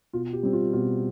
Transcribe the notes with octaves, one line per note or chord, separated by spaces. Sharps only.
B2 F4
G4
G3 C4
F4
B2 F4